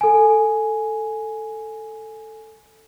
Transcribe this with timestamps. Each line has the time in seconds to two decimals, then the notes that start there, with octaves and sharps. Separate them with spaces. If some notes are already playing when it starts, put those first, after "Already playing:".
0.01 A4 G#5